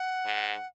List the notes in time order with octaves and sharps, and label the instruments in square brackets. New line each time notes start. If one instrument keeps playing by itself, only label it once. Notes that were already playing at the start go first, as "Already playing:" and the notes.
Already playing: [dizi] F#5
[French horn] G#2